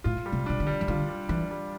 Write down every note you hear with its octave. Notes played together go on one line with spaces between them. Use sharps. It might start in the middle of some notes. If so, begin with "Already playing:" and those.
A2 F4
G3
C3
C3 D4
D3
G3
E3
D3 F4
G3
E3 D4
G3